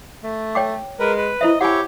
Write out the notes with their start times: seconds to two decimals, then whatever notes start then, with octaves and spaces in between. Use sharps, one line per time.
0.23 A3
0.55 C#5 G5 D6
1.00 G#3 A#4 B4
1.17 B4
1.41 E4 C5 D#5 E5
1.61 E4 G4 C#5 F#5 G#5